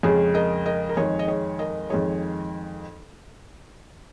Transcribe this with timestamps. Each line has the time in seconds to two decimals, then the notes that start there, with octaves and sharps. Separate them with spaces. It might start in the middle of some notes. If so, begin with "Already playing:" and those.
0.03 F2 C#3 G#3 G#4 C#5
0.34 A#4 D#5
0.66 A#4 D#5
0.89 A#4
0.97 F2 D#3 G#3 G#4 C#5
1.19 D#5
1.28 G#4 C#5
1.59 A#4 D#5
1.90 F2 D#3 G#3 G#4 C#5